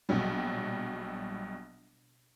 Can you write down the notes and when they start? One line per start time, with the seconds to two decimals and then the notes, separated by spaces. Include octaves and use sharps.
0.09 A#1 B2 F#3 G3